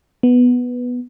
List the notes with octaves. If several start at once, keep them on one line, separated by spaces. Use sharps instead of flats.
B3